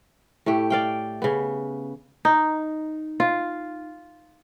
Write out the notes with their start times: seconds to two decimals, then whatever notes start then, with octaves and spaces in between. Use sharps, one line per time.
0.46 A2 A3 G4
0.70 D5 F5 G5
1.22 C#3 B3
2.25 D#4
3.20 F4